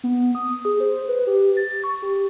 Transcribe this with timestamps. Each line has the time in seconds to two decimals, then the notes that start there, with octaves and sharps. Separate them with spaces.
0.04 B3
0.35 D#6
0.65 G#4
0.80 C5
1.08 B4
1.27 G4
1.57 A6
1.84 C#6
2.02 G4